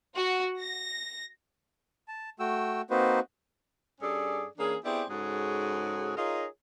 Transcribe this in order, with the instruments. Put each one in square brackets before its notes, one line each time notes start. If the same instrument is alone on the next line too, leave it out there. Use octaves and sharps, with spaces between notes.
[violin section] F#4
A#6
[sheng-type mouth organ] A5
A3 F#4 G5 E6
A#3 C4 D#4 F#4 B4 C5
[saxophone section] G2 C#4 G#4 A4 D5
E3 A#3 C#4 D4 G#4
B3 C4 E4 G4 G#4 D5
G#2 C#3 F#4 G#4 A4 C#5
D#4 F4 G#4 A#4 C#5 D#5